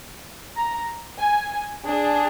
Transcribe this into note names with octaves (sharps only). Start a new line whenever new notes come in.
A#5
G#5
D4 G#4